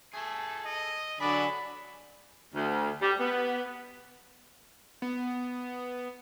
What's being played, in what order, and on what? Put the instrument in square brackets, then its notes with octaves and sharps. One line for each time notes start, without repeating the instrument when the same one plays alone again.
[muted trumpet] A3 [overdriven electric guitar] G#4 A4
[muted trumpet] D#5
[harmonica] D3 F#3 D4 [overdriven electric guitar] G#4 [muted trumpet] D5 [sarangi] B5
[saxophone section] D2
G3
B3
[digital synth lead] B3